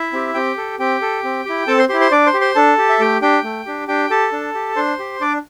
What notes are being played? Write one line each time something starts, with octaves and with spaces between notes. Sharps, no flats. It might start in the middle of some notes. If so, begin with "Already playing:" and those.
Already playing: E4 E5
C4 G4
C4 G4 G5
A4
C4 G4 G5
A4
C4
E4 G4
C4 A4 A5
C5 C6
E4 G4 C5 C6
C5 C6
D4 D5 D6
C5 C6
G4
C5 C6
D4 A4 A5
G4
E5
A3 G4 G5
D4 G4 G5
A3
D4 G4
D4 G4 G5
G4 A4 A5
D4
G4
D4 C5 C6
G4
D4 D5 D6